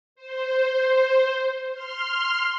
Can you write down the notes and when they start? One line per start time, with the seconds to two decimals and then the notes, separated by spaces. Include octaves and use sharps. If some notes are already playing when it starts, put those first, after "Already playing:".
0.16 C5
1.71 C6 F6